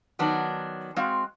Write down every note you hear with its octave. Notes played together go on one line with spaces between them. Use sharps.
D#3 F#3 B3 D4
G#3 C4 F#4 F5